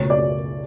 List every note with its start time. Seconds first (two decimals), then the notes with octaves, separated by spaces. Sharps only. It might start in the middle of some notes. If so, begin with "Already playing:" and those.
Already playing: C#2 B2 A3 C#5
0.10 D5